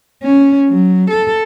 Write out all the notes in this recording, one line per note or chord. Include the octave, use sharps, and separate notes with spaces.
C#4
F#3
A4